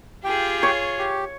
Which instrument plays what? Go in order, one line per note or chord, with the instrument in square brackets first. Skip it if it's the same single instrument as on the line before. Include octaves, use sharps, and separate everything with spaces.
[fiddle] F4 G#4 [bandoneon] G4 G5
[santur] C#5
[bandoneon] G4